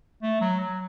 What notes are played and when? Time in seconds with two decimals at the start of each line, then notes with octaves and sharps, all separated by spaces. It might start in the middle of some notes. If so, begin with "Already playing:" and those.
0.23 A3
0.41 F#3
0.60 F#3